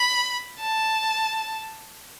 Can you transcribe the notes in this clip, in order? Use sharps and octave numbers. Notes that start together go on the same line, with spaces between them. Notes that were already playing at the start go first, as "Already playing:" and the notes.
Already playing: B5
A5